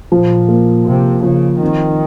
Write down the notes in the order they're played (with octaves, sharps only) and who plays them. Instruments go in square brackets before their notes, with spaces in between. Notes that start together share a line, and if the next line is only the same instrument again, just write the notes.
[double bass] A#2 [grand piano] F3
[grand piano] A#3
[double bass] C3 [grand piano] F4
[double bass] C#3 [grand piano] F3
[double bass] D#3 [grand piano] C4